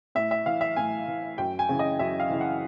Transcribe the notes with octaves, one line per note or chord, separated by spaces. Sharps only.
A2 E5
E5
E3 F5
E5
A2 G#5
E3
F#2 G5
G#5
C#3 E3
D#5
F#2 E5
F5
C#3 E3
F#5